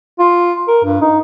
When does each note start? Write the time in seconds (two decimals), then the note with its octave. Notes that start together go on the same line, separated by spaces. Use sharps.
0.19 F4
0.68 A#4
0.84 G2
1.01 D#4